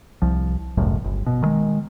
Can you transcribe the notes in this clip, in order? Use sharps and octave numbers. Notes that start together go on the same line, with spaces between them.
C2 F3
G1 C#2 F#2 A2
G1
B2
D#3 G#3